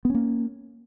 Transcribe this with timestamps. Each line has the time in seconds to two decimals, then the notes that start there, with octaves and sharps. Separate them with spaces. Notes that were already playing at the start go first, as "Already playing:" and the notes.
0.05 B3
0.10 C#4
0.14 A#3